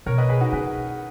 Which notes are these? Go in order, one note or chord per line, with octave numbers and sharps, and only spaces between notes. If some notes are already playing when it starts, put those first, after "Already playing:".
B2 A#4 C#5
B4 D#5
G#4 B4
D#4 F#4
C#3 G#4 B4